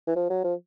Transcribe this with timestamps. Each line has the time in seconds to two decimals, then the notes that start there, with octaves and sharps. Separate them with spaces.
0.07 E3
0.16 F3
0.30 F#3
0.44 F3